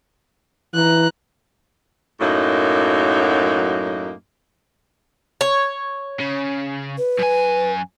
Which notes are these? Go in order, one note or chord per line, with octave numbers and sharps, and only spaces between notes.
E3 A#5 F#6
F#2 A2 F#3 A#3 D#4
C#5
C#3
B4
F#2 G#5